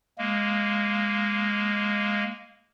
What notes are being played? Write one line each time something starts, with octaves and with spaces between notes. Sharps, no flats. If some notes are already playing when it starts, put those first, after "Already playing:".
G#3 A#3